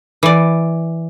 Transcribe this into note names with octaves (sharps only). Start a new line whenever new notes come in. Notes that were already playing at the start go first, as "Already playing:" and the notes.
E3 D5